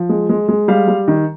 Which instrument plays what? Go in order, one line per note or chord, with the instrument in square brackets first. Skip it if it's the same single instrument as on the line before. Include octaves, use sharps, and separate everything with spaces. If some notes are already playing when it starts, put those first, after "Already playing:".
Already playing: [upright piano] F3
G#3
G#3
G#3
G3 F5
G3
D#3